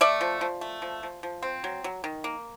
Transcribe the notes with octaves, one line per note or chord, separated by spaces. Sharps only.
A3 D5 E5
F3
F3
A3
F3
F3
F3
C4
F#3
F#3
D#3
A#3